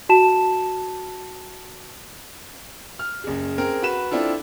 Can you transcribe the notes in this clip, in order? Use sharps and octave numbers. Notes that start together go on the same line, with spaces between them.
F#4 A5 E7
F6
F#1 G#4
C4 G#4 A#4
F#4 B4 E7
C4 D4 E4 F4 A4